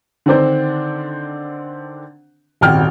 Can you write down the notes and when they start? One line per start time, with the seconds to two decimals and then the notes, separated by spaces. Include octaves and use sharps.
0.26 D3 D#3 C4 D4 C5
2.61 D#1 G#1 G5 F6